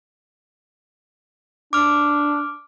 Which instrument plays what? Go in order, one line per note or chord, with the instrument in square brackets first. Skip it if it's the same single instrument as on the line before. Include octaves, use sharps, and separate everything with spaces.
[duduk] D4 [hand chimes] D6 F6